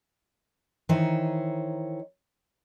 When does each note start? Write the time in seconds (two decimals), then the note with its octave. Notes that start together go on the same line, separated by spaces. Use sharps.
0.89 D#3 E3 D#4 C5 C#5